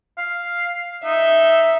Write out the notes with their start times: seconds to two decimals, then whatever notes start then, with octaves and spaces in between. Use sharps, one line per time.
0.18 F5
1.05 D#4 E5